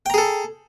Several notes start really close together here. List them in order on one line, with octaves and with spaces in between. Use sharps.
G5 A#5 G#4 A4